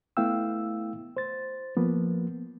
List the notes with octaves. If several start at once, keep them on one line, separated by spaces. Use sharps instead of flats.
A3 B3 E4 F5 G5 E6
C5 A6
F3 A#3 B3